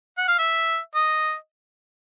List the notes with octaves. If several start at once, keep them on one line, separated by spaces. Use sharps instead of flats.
F#5
F5
E5
D#5